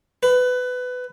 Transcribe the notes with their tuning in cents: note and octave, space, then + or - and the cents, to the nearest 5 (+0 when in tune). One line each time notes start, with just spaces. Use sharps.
B4 +20